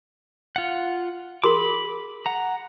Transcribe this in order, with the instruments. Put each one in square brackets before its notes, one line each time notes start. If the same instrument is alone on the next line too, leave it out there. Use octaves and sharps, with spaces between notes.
[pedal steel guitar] F4 F#5
[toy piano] G#4 A#4 C6 [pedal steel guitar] B5 D6
[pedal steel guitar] F#5 A#5